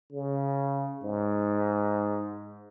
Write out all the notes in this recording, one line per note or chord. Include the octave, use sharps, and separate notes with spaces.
C#3
G#2